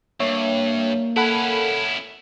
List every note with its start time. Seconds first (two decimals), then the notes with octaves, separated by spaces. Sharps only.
0.20 G2 A#3 C#5 E5
1.16 C#4 E4 A4 F#5 B5